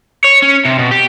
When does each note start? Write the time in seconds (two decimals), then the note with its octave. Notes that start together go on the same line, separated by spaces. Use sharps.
0.24 C#5
0.43 C#4
0.65 C3
0.79 B2
0.91 G4